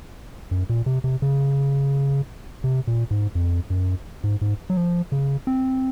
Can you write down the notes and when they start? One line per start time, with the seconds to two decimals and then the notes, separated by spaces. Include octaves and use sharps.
0.51 F#2
0.70 A#2
0.86 C3
1.04 C3
1.22 C#3
2.64 C3
2.87 A#2
3.11 G#2
3.35 F2
3.70 F#2
4.24 G#2
4.42 G#2
4.70 F#3
4.77 F3
5.12 C#3
5.47 C4